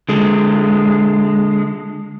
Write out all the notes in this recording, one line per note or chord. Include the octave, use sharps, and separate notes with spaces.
D3 G#3